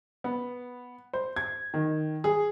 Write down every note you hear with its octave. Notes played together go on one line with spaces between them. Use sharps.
B3
C5
G#6
D#3
G#4